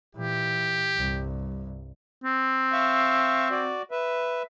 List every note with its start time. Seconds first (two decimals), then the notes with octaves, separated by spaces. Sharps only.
0.15 A#2 E3 G4
0.97 C2 G2
2.24 C4
2.72 E5 F5 C#6
3.51 F#4 D5
3.91 B4 E5